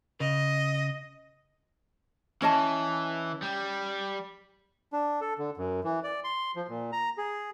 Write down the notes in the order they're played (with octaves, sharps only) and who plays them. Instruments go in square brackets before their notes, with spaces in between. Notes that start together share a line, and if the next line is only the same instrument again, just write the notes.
[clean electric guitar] C#3 [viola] D#5
[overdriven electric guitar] E3 [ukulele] C#4 D#5 A5
[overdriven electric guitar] G3
[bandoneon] D4
A4
D3
F#2
E3
D5
C6
F3
A#2
A#5
G#4